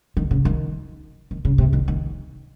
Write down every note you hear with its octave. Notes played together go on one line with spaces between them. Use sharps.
D#3
C#3
D#3
D#3
C#3
C3
D#3
D#3